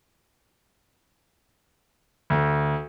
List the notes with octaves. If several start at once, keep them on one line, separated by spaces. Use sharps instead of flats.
D2